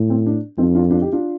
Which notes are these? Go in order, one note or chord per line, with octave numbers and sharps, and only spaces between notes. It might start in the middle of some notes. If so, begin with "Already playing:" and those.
Already playing: A2
C4
D4
F2 C4 D#4
D4 F4
D4 F4
D#4 G4
D4 F4